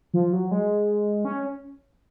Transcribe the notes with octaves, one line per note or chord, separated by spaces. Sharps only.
F3
F#3
G#3
C#4